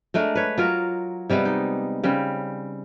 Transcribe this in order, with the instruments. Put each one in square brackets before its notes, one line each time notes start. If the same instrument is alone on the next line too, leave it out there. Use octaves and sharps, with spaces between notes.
[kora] G#3 A3 D4 A#4
B4 C#5
F#3 F4 A#4
C3 G3 G#3 B3
D#4
C#3 G3 C4